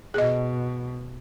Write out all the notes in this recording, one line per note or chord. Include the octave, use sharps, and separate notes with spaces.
B2 G#4 D#5